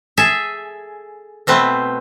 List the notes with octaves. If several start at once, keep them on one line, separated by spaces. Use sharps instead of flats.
G#4 A4 E5 G#5
B2 A3 C4 B4